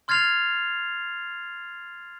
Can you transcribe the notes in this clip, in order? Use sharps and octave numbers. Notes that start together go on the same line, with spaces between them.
C6 F6 G#6 A6 C7 F7